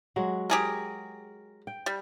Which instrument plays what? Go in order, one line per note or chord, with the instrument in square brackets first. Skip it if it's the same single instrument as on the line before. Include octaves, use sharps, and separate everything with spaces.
[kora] F#3 G#3 F#4
[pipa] G4 G#4 A#4
[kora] G5
[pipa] G3